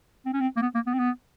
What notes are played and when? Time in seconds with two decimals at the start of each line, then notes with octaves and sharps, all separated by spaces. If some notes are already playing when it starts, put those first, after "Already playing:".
0.26 C4
0.33 C#4
0.41 C4
0.57 A#3
0.62 B3
0.75 A#3
0.87 B3
0.94 C4
0.99 B3